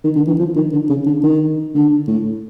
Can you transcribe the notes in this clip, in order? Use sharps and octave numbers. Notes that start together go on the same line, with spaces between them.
D#3
D3
E3
F3
D#3
D3
C#3
D3
D#3
D3
A2